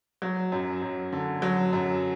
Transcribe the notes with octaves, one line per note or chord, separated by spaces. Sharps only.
F#3
F#2
F#2
D3
F#3
F#2